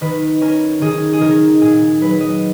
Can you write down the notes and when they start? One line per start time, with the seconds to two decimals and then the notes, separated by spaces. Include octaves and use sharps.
0.01 D#3 B4
0.41 C#4 A#4
0.81 D#3 G#4
1.13 G#4
1.21 D#3 A#4
1.61 A#2 G#4
2.01 F#3 B4
2.21 D#5